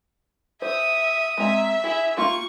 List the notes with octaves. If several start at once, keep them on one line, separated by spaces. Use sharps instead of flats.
C5 E5 D#6
G#3 C4 E5 A#5
E4 G#4
A#3 F4 G4 C#6